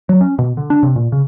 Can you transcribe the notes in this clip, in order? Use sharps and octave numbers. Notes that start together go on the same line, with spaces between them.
F#3
C#4
B2
D3
D4
C3
A#2
C#3